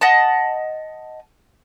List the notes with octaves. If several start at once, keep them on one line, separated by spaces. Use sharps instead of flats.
D#5 F#5 A5